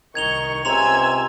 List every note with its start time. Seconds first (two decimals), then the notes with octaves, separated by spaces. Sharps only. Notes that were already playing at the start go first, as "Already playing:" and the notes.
0.15 C2 D#3 D#4 C#6 G#6 F7 G7
0.65 C#2 C3 G#5 A#5 C6 E6 G#6 F7